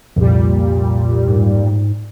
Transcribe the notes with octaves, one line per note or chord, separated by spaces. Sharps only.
C2 F2 A#2 G3
G#2